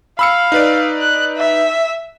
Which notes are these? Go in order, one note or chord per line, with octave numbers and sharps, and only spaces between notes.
F5 B5 E6 C#7
D#4 B4 D5
F#6
E5